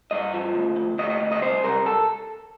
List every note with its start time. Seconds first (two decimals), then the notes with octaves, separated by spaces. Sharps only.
0.11 G2 D#5
0.34 F3
0.55 D2
0.76 D2
0.98 D2 D#5
1.10 D#5
1.21 D2
1.32 D#5
1.42 C2 C5
1.64 C2 A#4
1.86 A4